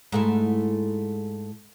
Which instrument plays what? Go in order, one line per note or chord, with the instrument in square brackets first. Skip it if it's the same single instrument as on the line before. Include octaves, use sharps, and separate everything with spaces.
[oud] G#2 A3 E4